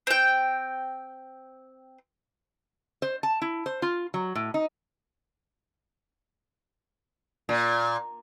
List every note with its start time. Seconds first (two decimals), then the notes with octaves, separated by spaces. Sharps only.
0.07 C4 G5
3.02 C5
3.23 A5
3.42 E4
3.66 C5
3.82 F4
4.14 F#3
4.35 A2
4.54 D#4
7.49 A#2